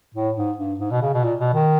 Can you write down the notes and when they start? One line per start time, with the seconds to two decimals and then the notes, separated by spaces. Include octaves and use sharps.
0.15 A2
0.36 G#2
0.58 G2
0.80 G#2
0.91 B2
1.02 C#3
1.14 B2
1.24 A#2
1.40 B2
1.54 D#3